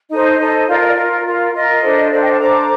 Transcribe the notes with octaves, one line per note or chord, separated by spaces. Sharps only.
D#4 A4 C5 D#5
D#4 A4 C5
F4 A#4 D5 F5
D#5
D5
F4 A#4
F4 A#4
F4 A#4 D#5
D4 A4 C5
D4 A4 C5 D5 F5
D#5 G5
F5 A5
D4 A4 C5 A#5 D6